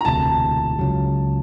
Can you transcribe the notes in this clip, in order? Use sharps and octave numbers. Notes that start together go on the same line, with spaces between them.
A#5
E1 D2 C3 A5
C#2 C#3 F#3